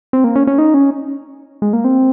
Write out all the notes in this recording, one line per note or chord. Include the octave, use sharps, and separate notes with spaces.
C4
A#3
C#4
C#4
D#4
C#4
G#3
A#3
C4